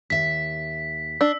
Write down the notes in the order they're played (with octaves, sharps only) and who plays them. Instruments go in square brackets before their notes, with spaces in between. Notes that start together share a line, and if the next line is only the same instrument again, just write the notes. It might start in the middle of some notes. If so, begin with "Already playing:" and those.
[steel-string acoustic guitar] D#2 E5 [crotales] B6
[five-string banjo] D4 [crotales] E6